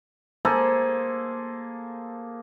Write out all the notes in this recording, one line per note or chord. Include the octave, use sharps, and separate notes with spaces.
A#3 G#4 A4 C5